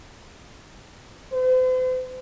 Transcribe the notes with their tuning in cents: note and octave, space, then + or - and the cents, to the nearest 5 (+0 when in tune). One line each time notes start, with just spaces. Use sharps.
C5 -40